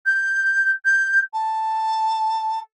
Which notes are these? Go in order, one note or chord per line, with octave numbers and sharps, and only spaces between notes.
G6
G6
A5